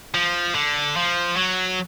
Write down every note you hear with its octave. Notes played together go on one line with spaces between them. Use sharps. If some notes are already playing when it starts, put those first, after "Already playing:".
F3
D3
F3
F#3